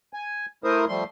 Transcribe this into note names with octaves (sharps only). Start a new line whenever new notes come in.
G#5
A3 E4 A#4 C5 D#6
F3 G3 A3 C6